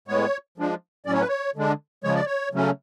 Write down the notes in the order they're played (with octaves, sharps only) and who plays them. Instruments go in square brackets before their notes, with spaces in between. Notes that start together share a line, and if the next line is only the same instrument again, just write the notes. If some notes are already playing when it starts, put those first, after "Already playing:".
[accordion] A2 G#3 B3 C#5
F3 G#3 D4
A2 F#3 C#4 D5
C#5
B4
C#5
D3 G#3 D4
C#3 F3 G#3 C#5
D5
C#5
C#3 F#3 A3 C#4